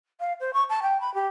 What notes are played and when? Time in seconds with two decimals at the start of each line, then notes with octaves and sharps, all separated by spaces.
0.20 F5
0.40 C5
0.53 C#6
0.69 A5
0.82 G5
1.00 B5
1.14 G4